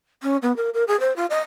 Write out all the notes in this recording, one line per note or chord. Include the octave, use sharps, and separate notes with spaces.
C#4
B3
A#4
A#4
G#4
C5
F4
D#5